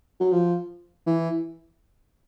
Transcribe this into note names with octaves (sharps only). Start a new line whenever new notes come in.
F#3
F3
E3